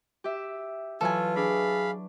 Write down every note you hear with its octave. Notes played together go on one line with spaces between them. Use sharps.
G4 E5
E3 F#3 F4 A4 B4 G#5
D4 G#4 F5 B5